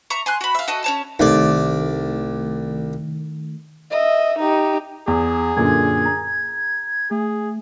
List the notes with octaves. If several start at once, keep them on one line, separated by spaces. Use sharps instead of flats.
E5 A#5 C#6
G#5 C6 F#6
F#4 B5
E5 F5
F#4 A4 D#5
C#4 C#5 A5
C2 D#3 A3 D5
D#5 E5
D#4 G4
E2 G#4
F#2 A#2 D3 G#6
A#5
A3 G#4